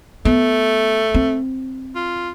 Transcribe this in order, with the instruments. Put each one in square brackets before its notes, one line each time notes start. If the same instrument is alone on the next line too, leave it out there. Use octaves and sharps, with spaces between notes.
[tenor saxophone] A3 [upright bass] B3
[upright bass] C4
[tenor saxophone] F4